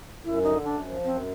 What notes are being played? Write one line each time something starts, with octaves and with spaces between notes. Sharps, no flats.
F#2 E4
D3 D#4
F#2 D4
F3
F#2 C4